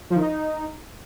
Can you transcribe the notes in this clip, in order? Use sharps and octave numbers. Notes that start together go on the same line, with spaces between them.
F3
D#3
D#4